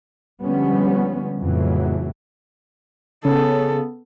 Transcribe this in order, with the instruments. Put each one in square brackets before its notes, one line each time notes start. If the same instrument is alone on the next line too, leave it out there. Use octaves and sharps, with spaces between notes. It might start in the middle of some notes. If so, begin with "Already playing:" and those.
[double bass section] D3 F3 G3 G#3 B3 C#4
F2 A2 C#3 E3 F#3
[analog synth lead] C#3 [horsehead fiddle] B3 A4